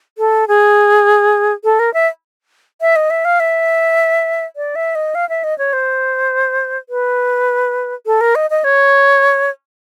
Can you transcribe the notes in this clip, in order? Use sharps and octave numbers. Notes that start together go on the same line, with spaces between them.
A4
G#4
A4
A#4
E5
E5
D#5
E5
F5
E5
D5
E5
D#5
F5
E5
D#5
C#5
C5
B4
A4
A#4
D#5
D#5
C#5